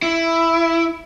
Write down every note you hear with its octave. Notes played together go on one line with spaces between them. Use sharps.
E4